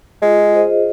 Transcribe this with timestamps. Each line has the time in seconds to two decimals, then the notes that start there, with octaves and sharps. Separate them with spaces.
0.22 G#3 F4
0.53 G#4 C5 D#5